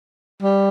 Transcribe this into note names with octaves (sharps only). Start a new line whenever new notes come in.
G3